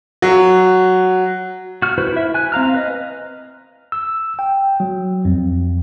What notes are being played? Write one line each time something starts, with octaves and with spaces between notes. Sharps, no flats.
F#3
F#4 F6
E4 F#4 B4 C5
E4 E5
G#5 F#6
C4 F5 A#5 F6
B4 D#5
E6
G5
F#3
F2